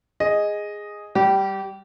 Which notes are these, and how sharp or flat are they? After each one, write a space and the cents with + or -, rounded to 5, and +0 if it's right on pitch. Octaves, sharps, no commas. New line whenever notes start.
G#4 -5 D#5 +0
G3 +0 G4 -25